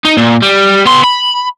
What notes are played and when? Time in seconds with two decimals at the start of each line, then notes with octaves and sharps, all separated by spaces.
0.05 D#4
0.17 A#2
0.42 G3
0.86 B3 C6
1.04 B5